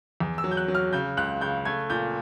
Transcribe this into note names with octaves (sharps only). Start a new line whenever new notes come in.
E2
E6
F#3
G6
F#6
F#3
F6
C#3 G6
C#2 F#6
C#3 G6
A3 G#6
A#2 G6